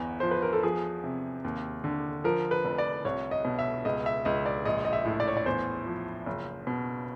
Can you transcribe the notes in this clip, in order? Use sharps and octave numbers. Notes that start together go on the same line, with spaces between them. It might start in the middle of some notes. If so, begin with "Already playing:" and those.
Already playing: G1 E2
F3 C5
B4
A#4
A4
F3 G#4
C3
D#2
D3
F3 A#4
B4
F1
D5
C2 C#5
D#5
B2
E5
C#2 D#5
E5
C#2 D#5
D5
A#1 D#5
D#5
E5
A2
D5
C#5
D5
E2 C5
F3
F#1
B2